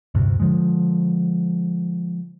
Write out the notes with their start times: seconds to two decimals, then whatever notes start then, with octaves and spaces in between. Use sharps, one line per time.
0.15 D2 G2 C3
0.40 D3 F3 G#3